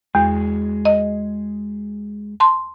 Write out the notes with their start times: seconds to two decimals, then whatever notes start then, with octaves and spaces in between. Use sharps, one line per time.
0.15 E2 G#3 F#4 G#4
0.85 D#5
2.40 A5 C6